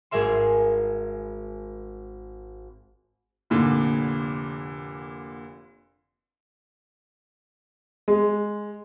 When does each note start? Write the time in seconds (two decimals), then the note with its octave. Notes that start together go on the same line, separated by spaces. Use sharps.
0.11 G#1 G#4 A#4 E5 C6
3.50 F1 A#2 D3
8.08 G#3